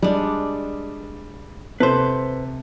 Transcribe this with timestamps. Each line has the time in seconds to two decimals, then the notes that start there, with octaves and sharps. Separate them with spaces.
0.02 G3 G#3 D4
1.80 C3 A4 B4 C5